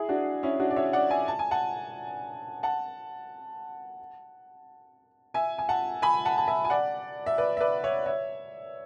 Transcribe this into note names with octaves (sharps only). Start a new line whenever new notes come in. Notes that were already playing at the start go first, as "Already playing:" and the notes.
Already playing: E4 G#4
D4 F#4
C#4 E4
D4 F#4
D5
C#5 E5
D5 F#5
E5 G#5
A5
G#5
F#5 A5
F#5 A5
E5 G#5
G#5
F#5 A5
G#5 B5
F#5 A5
A5
E5 G#5
G#5
D5 F#5
E5
B4 D5
E5
B4 D5
C#5 E5
C#5 E5